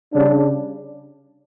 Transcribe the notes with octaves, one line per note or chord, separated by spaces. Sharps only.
C#3 G3 D4